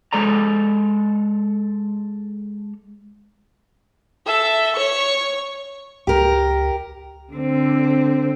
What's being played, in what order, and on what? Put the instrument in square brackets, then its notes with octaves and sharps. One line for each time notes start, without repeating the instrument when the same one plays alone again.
[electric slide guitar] G#3 A4 D5 A#5
[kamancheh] A4 E5
C#5 C#6
[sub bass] C#2 [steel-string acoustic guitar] G4 A#4
[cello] D3 C4